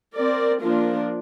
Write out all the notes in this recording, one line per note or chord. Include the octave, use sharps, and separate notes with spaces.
C4 A#4 D5
F3 A#3 D4 F4 A#4